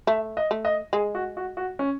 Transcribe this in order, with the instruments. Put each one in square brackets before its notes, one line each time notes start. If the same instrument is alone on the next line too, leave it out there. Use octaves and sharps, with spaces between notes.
[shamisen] A3 [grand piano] E5
[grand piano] D#5
[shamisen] A3
[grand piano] D#5
[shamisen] G#3 [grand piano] G#4
[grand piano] F#4
F#4
F#4
C#4